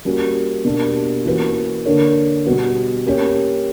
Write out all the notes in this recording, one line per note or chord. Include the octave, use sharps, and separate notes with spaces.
G3 A#3 C#4 F#4
B2 A#3 D4 G4
E3 A#3 C#4 F#4 B4
D3 A#3 D4 A#4 C#5
B2 G3 B3 F#4 B4
A#3 C#4 G4 C#5